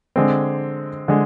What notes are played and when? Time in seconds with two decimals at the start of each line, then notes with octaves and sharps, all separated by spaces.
0.16 D3 G#3 C4
1.08 D3 G#3